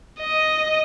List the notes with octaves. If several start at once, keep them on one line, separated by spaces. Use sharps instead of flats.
D#5